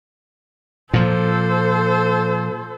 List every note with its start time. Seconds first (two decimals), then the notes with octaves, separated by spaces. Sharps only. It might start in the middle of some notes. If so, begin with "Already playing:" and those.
0.93 A#2 F3 A4 C5